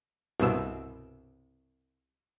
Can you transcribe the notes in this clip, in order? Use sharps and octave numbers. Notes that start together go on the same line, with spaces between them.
C2 G2 B2 E6